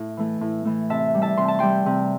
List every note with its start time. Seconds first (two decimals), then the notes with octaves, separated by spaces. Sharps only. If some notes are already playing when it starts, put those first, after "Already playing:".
Already playing: A2
0.17 E3 A3
0.41 A2
0.65 E3 A3
0.90 C3 E5 A5
1.15 G3
1.22 E5 A5
1.37 C3 C6
1.48 A5
1.59 G3 G5 C6
1.86 C3